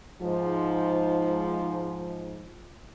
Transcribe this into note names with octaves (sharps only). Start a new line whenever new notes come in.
G#2 F3